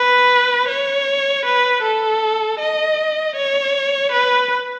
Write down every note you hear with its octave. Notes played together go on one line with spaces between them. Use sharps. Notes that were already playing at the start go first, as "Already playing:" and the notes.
Already playing: B4
C#5
B4
A4
D#5
C#5
B4